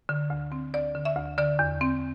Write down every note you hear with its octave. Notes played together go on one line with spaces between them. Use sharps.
D3
D2
C4
D2 D5
D3
E5
D2
D3 D5
E2
C4